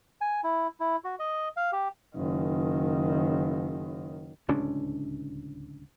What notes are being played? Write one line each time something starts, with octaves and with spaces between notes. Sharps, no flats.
G#5
E4
E4
F#4
D#5
F5
G4
F#1 D#3
D1 C#2 C#4 D4